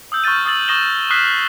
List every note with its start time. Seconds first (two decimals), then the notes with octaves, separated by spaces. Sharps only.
0.12 D#6 E6 G6
0.24 C#6 F6 G6 A6 D#7
0.46 D#6 E6 A6 F#7
0.68 C#6 D#6 A#6 D#7 E7 G7
1.10 D#6 F6 F#6 B6 C7 E7